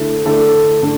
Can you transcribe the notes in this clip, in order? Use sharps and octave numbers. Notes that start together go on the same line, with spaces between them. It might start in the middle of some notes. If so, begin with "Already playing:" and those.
Already playing: D3 A3 E4 A4
D3 A3 E4 A4
D3 A3